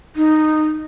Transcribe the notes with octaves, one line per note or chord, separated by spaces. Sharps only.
D#4